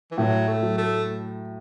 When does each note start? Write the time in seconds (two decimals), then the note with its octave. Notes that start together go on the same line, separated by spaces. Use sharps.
0.11 E3
0.18 A2 F#3
0.48 A3
0.63 F#3
0.78 A3